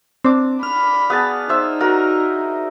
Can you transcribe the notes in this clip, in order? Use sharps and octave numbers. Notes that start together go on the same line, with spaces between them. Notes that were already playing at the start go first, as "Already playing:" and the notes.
C4 D4 D6
B5 F6
B3 G#4 A5
D#4 C5 E5
F#4 A#4